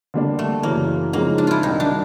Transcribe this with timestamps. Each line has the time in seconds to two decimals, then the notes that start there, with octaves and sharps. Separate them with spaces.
0.14 D3 G3 A#3 D4
0.39 A3
0.63 F#2 C#3 E3 A#3
1.13 C#3 F3 G#3 A#3 C4 D#4
1.38 D4
1.47 E4 F4
1.63 C2 C3 D#3 F#3 D#4
1.80 D4